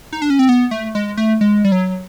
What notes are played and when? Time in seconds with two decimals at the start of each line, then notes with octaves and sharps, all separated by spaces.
0.13 D#4
0.22 D4
0.30 C#4
0.39 C4
0.49 B3
0.71 A3
0.95 G#3
1.17 A3
1.41 G#3
1.64 G3
1.72 F#3